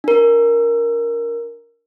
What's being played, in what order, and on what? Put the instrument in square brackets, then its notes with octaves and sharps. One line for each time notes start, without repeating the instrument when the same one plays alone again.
[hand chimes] D4 A#4